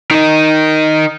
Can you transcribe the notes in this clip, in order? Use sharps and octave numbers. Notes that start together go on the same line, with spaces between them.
D#3 D#4